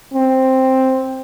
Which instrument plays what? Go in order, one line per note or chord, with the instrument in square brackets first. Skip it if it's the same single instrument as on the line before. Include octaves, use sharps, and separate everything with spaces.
[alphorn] C4